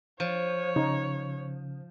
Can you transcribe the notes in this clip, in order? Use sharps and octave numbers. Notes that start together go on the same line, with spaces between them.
F3 C#5
C#3 D#4